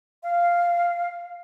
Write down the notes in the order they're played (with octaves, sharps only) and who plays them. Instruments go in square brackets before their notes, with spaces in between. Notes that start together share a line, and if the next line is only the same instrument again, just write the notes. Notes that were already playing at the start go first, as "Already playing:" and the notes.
[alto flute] F5